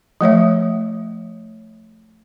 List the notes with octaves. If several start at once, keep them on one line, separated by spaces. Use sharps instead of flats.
F3 A3 C#5 E5